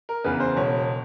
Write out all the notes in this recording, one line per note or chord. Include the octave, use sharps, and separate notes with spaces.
A#4
E2 C#3 B4
C5
E1 C#5